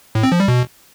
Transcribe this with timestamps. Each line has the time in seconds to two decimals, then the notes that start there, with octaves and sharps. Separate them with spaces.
0.15 A2
0.23 C4
0.32 F3
0.40 G3
0.48 B2